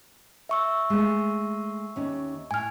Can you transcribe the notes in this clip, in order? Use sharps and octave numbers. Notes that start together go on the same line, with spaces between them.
E5 C#6 E6
G#3 A3
D#2 C#4
A2 G#5 F6